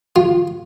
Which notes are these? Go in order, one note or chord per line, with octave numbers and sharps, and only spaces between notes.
F4